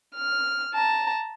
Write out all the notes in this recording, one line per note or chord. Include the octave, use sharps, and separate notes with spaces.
F6
A5 A#5